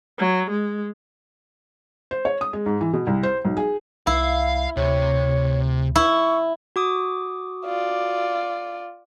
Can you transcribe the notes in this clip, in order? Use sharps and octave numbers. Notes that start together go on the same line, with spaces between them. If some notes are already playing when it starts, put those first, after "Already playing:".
F#3
G#3
C5
C#5
D#6
G#3
G#2
E3
B2
C2
C5
B1
G#4
C2 E4 F5
D2 C3 C#5
E4 C#6
F#4 D6 D#6
F4 D5